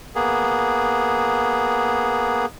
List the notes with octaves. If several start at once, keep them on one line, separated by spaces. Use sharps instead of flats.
A#3 B3 G#4